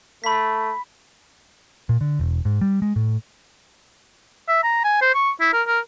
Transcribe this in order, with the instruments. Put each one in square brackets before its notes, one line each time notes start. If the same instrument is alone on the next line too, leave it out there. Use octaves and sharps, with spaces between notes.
[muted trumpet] A3 [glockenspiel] B5 B6
[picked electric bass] A#2
D3
E1
G#2
G3
G#3
A2
[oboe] E5
A#5
G#5
C5
C#6
E4
A#4
A#4